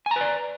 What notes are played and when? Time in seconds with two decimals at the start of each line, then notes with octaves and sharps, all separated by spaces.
0.06 G#5
0.11 A#5
0.16 B4
0.21 D5